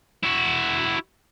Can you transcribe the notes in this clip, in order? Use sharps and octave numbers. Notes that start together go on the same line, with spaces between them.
E4 F#4